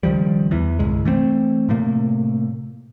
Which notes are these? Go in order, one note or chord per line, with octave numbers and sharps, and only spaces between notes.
C#2 D#3 F3 G3
E2 E3
G1 C2 G#3
E3 A3 B3 C4
A2 C3 A3 A#3